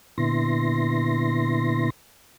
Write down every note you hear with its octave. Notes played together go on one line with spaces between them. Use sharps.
A#2 D3 B3 E4 C6 A#6